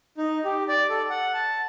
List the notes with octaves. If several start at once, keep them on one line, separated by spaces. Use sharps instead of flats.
D#4
G4
D5
A4
F#5
A5